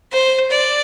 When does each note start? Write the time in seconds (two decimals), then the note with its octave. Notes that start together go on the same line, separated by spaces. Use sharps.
0.12 C5
0.50 D5